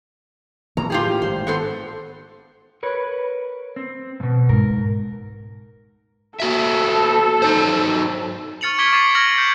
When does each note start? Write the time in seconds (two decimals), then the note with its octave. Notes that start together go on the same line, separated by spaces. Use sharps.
0.77 A2 E3 A#3 A#5
0.90 F4 G4 G#4
1.22 G#1 C5
1.47 B3 A4 C5
2.83 A#4 B4 C#5
3.76 C4
4.20 G#2 B2
4.49 G#2 A#4
6.40 A#3 F#4 A4 E5
7.42 F#3 D#4 C5
8.61 C#6 F6 A6 C#7 F7 F#7
8.78 C#6 D6 G#6 B6 D7 G7
8.92 C#6 D6 A6 C7 F7
9.15 F6 G#6 A#6 F#7
9.38 G6 C#7